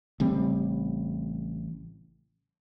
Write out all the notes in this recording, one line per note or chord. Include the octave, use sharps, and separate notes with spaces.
A1 C#3 G3 C4